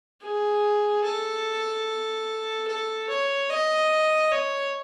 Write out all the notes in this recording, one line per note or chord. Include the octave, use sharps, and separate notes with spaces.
G#4
A4
A4
C#5
D#5
C#5